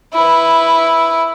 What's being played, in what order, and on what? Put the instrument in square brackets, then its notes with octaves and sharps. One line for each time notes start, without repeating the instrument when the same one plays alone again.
[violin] E4 B4